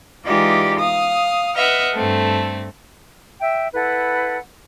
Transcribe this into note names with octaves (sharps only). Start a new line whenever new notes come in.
E3 G#3 D#4 F4 G4 D5
F5 D#6
B4 D#5 E5 F#5 F6
G2 A3 C4 A4
E5 G5
E4 A4 B4 F#5